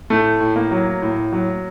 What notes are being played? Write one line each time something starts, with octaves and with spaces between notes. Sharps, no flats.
A2 A3
A2
A#3
F#3
A2
F#3